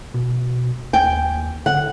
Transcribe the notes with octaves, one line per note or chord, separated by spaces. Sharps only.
B2
D#2 G5 G#5
D3 F#5